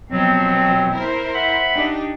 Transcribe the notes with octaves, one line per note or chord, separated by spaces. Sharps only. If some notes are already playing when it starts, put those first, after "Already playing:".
B2 F3 F#3 C4
E4 A#4 C5
E5 F#5 B5
D4 D#4 G4